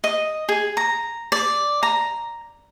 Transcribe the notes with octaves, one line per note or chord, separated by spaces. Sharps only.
D#5
G#4
A#5
D5
A#5